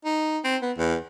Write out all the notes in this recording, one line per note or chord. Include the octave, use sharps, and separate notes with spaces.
D#4
C4
B3
E2